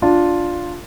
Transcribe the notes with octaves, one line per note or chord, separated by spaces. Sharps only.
D4 F4